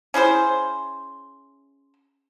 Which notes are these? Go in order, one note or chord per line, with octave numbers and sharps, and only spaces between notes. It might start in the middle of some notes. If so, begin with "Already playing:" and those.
C#4 E4 G#4 C5